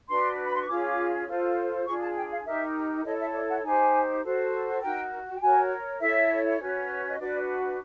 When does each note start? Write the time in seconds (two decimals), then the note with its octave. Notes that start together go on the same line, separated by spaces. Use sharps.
0.09 D4 F#4 B4 C6
0.45 B5
0.53 C6
0.60 C#6
0.68 C#4 F4 G#4 D6
1.27 F4 A4 C5
1.86 D4 F4 G#4 C#6
2.01 A5
2.16 G5
2.31 F5
2.45 D#4 G4 A#4 E5
3.05 E4 A4 C#5 D#5
3.19 E5
3.34 D5
3.49 F#5
3.63 D#4 G4 C5 G#5
4.23 F#4 A4 C5
4.82 D#4 F#4 A#4 G5
5.36 G5
5.41 F#4 A#4 C#5 G#5
6.00 E4 A4 C#5 E5
6.59 C#4 F#4 B4
7.10 D#5
7.18 D4 F#4 B4 D5